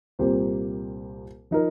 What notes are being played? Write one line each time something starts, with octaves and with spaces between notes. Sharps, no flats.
C2 A#2 A#3 G4 C5
F3 D#4 A#4